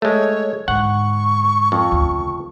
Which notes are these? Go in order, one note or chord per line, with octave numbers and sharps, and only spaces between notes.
G#3 A3 C#5
G#2 D3 F#5 C#6
F2
D2 C#3